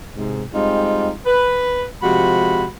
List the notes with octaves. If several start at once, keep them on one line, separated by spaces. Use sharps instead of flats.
G#2 C3
G3 G#3 C4 D#4 F4
B4
C3 F3 G#3 F#4 B5